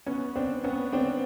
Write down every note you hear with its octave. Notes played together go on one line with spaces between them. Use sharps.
B3 C#4
C4 D4
B3 C#4
C4 D4